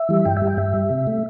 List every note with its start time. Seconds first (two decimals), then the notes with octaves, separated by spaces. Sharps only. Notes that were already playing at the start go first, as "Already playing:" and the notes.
Already playing: E5
0.09 E3 G3
0.25 G2 G5
0.37 G3 E5
0.47 G5
0.57 G2 E5
0.74 G3
0.90 C3
1.07 A3